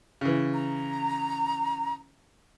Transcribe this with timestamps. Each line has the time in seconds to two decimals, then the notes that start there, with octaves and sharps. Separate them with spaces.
0.21 C#3 E3
0.54 A#5